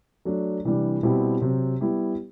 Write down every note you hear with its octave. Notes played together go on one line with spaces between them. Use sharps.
F#3 A3 D4
C3 E3 G3 D4
B2 G3 C4 E4 G4
C3 F#3 C4
G3 B3 E4 G4